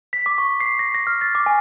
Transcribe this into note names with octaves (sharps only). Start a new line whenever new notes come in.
B6
D6
C#6
C7
A#6
A#6
F6
A6
D6
G#5